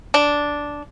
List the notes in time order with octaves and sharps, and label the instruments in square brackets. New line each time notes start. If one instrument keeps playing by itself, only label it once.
[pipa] D4